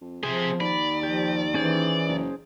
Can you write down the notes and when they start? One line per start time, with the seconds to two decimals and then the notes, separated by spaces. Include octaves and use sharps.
0.01 F2
0.23 C3 F3 G#4 C5
0.60 D#2 D5 B5
1.03 F3 G4
1.54 E3 C#4 G#4 C5
2.08 F#1